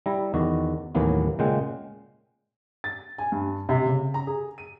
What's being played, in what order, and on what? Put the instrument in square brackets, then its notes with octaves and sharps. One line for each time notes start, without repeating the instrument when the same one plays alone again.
[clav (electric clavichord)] G3 E4 A#5
E2 D#3 F#4
D#2 A2 E3 F#3 A#3 B3
A#2 C#3 G#3 F#5 G5
[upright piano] A6
G#5
G2
C3
C#3
A#5
G#4
D#7